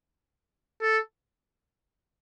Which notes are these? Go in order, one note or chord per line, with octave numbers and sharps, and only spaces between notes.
A4